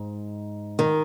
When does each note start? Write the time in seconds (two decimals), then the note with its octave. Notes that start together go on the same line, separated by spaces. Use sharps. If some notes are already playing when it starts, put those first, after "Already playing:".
Already playing: G#2
0.79 D#3